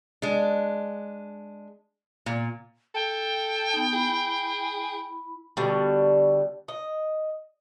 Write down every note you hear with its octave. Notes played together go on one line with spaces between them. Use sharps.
G#3 D4
A#2
A4 G5
B3 D#4
E4 G#4 B5
B2 D3 G3
D#5